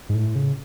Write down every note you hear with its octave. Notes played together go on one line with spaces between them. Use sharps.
G#2
A2
C#3